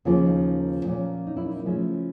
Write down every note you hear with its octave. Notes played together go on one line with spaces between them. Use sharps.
D#2 C#3 F3 A#3 F4
D#4
A#2 F3 A#3 C#4
D#4
E4
D#4
D#4
C#3 F3 A3 C#4 E4